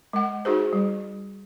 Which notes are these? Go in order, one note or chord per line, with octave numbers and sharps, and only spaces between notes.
G#3 F#5
D#4 F#4 G#4 C5
G3